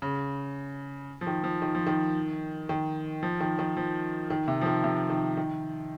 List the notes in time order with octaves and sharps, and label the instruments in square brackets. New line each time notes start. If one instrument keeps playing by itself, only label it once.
[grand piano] C#3
F3
D#3
F3
D#3
F3
D#3
D#3
F3
D#3
D#3
F3
D#3
C3
F3
D#3
C3
D#3
D#3